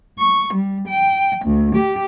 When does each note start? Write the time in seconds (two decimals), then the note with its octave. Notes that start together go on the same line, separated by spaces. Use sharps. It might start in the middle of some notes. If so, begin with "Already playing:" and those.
0.19 C#6
0.54 G3
0.88 G5
1.45 D2
1.76 G4